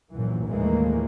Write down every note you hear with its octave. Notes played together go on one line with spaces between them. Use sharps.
A#1 F#2 E3
D#2 A2 E3 F3 G#3 A#3